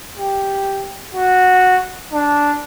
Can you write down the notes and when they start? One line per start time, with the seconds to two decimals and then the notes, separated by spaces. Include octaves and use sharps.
0.18 G4
1.15 F#4
2.13 D4